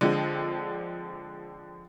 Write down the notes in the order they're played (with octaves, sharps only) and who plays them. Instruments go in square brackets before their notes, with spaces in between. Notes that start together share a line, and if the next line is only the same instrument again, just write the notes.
[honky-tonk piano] D3 F3 G#3 C4